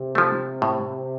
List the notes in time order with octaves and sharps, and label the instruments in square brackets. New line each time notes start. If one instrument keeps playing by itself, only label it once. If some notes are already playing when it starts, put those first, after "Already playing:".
Already playing: [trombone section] C3
[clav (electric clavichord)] F3 A3
A2